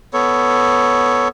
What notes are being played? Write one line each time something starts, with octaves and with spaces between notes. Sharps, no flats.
B3 A4 C#5